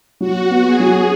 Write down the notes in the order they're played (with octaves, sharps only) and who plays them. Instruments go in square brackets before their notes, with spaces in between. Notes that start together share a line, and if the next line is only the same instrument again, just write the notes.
[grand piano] F#3 [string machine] F#4
[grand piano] B3
[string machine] G#4
[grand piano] F#3